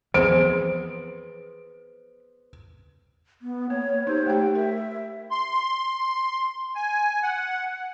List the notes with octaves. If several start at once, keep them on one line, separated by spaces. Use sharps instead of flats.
E3 F3 B3 C4 G#4 C5 D7
B3
A#3 C#5
D#4 G4 C5
A3 G4 G5
A#4 E5
C6
G#5
F#5